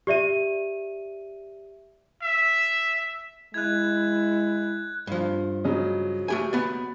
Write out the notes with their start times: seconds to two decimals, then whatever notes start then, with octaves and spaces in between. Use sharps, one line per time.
0.07 G4 D5 E5 D#7
2.22 E5
3.54 G#3 E4 F#6 G#6
5.07 G2 F3
5.64 C#3 F#3 D#5
6.28 A3 G4 G#5
6.53 B3 D5